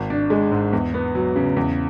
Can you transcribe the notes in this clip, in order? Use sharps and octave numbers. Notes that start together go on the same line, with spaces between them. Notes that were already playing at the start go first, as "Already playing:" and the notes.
Already playing: G#1
D4
G#3
G#2
E2
B3
F#3
C#3
E2